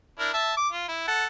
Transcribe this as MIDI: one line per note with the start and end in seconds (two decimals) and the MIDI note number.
0.19 0.31 62
0.19 0.31 64
0.19 0.31 70
0.33 0.53 76
0.33 0.53 81
0.57 0.68 86
0.72 0.86 65
0.88 1.03 64
1.08 1.26 69
1.08 1.26 78